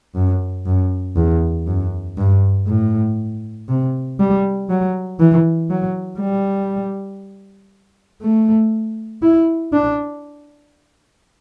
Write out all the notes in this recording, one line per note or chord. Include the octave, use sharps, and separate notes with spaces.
F#2
F#2
E2
F#2
G2
A2
C3
G3
F#3
E3
F#3
G3
A3
E4
D4